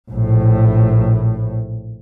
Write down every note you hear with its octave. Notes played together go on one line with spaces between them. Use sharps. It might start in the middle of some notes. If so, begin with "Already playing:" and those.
A#1 A2